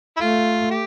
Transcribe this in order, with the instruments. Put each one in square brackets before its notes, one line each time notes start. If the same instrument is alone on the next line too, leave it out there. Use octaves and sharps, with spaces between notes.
[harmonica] E4
[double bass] A3 [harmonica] F4
[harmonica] G4